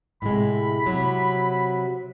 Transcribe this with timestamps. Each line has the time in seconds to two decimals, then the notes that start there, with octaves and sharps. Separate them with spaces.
0.22 A2 C3 G#3 B5
0.86 C3 F#3